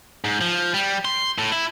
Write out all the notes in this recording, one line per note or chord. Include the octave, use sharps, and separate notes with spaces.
G#2
F3
G3
C6
A2
E4